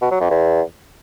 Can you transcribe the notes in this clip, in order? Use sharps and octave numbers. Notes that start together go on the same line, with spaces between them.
B2
F#3
F2
E2